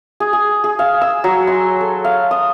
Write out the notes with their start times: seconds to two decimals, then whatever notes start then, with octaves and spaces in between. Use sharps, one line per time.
0.20 G#4
0.33 G#4
0.64 G#4
0.79 F5
1.01 E6
1.24 F#3
1.47 C6
1.81 A4
2.04 F5
2.31 D#6